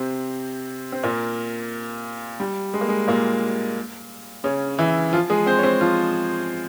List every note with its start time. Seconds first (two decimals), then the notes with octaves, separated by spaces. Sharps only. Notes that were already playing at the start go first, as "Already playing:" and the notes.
Already playing: C3 C4
0.92 C4
1.03 A#2 A#3
2.40 G3
2.74 G#3
2.81 A#3
2.89 G#3
3.07 A#2 A#3
4.44 C#3 C#4
4.79 E3 E4
5.13 F3 F4
5.30 G#3 G#4
5.46 C4 C5
5.59 C#5
5.63 C4 C5
5.81 F3 F4